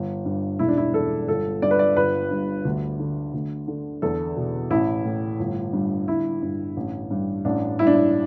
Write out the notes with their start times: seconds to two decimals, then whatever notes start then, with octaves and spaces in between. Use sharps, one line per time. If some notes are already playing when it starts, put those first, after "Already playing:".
Already playing: G1
0.25 G2
0.59 E1 E4
0.68 D4
0.77 E4
0.94 E2 A4
1.28 G1 A4
1.62 G2 D5
1.71 B4
1.79 D5
1.97 G1 B4
2.31 G2
2.65 D2
2.99 D3
3.34 D2
3.68 D3
4.02 E2 A4
4.36 B2
4.70 A1 E4
5.05 A2
5.39 G1
5.73 G2
6.08 G1 E4
6.42 G2
6.77 A1
7.11 G2
7.45 A1 D4
7.79 G2 E4
7.87 D4
7.94 E4